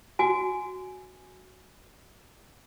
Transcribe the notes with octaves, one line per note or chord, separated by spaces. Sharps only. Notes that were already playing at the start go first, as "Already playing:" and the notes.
F#4 G#5